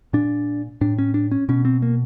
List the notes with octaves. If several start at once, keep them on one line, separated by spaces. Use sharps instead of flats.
A#2 D4
A2 D4
C#4
D4
C#4
B2 C#4
C4
A#3